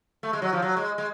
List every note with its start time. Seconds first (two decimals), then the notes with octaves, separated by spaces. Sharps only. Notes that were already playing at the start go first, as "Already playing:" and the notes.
0.23 A3
0.33 G#3
0.42 F#3
0.53 F3
0.62 F#3
0.77 G#3
0.98 G#3